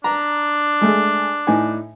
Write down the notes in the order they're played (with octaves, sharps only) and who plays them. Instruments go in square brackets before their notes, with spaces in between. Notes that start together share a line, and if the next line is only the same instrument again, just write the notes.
[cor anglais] D4 [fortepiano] A#5
[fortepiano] G#3 A3 G#4
A2 D#4 G#5